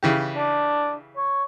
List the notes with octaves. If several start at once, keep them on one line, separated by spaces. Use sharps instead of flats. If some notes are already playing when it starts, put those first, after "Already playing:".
C#3 E3 G4
D4
C#5